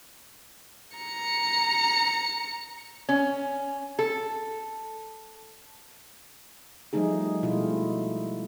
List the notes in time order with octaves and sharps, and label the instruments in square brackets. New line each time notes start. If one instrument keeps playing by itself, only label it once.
[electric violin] A#5 C#7
[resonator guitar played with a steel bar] C#4
A4
[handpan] F3 G3 A3 D#4 G#4
B2 G#3 A3 E4 F4